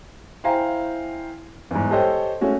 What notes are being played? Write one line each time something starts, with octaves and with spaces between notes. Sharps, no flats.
E4 C5 F5 G5 G#5 A#5
E2 G#2
G4 A4 C5 C#5 D#5 G5
G#3 A3 C#4 F#4